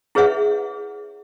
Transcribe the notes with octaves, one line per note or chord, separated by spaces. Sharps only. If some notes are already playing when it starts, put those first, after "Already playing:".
E4 G#4 B4 C#5 E5 F#5